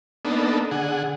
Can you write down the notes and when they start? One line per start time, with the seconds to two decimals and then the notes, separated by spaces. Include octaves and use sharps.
0.25 A#3 B3 D4 D#4 A4
0.71 D3 G#4 F#5